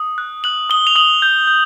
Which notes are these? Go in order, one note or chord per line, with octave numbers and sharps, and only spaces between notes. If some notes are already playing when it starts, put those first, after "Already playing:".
Already playing: D#6
F#6
F#6 F#7
D#6 G7
F7
D#6 F#7
G6
G6